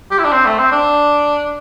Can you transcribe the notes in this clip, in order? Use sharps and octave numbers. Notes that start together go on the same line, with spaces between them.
G4
E4
D4
C4
A3
C4
D4